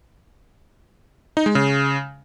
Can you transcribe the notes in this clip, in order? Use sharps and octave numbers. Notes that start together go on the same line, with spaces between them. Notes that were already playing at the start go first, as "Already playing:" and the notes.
D#4
G#3
C#3